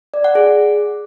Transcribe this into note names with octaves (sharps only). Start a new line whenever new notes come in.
D5
F#5
G#4